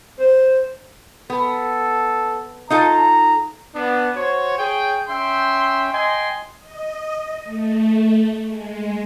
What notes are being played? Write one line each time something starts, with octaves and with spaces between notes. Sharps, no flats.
C5
B3 A4
D#4 F4 A4 A#5
B3 D4
F#4 C5 C#5
G#4 C#5 G5
C#4 E5 G5 C6
D#5 G5 G#5 C6
D#5
A3
G#3